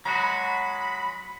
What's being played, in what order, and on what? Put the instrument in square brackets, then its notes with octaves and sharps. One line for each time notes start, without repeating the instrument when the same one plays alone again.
[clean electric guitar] F#3 G#3 F#4 [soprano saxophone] B5